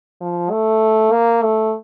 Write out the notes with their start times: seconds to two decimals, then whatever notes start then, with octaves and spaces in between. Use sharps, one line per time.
0.21 F3
0.51 A3
1.12 A#3
1.42 A3